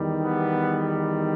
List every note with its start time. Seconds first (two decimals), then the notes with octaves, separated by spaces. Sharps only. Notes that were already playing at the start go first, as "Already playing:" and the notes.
Already playing: E2 D#3 G3
0.20 B3